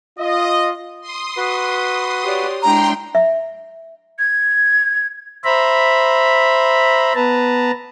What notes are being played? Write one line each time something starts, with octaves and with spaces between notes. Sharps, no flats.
F4 D#5
C6 D#6
F#4 B4
G4 C#5 D5
G#3 D4 E4 G5 A#5 C6
E5
G#6
C5 E5 A#5 B5
B3 B4 A5 A#5